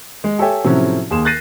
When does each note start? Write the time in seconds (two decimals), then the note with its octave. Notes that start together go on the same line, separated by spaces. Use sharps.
0.24 G#3
0.38 G4 A4 C#5 E5 G5 G#5
0.64 A2 C3 F3 F#3 C#4 E4
1.11 D#2 G#4 C6 E7
1.25 F#6 G6 A6 A#6 C7 D#7